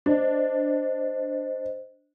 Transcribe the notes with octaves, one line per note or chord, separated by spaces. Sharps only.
D4 C5 D#5